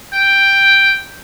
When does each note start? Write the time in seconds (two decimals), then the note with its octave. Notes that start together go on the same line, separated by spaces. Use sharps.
0.13 G5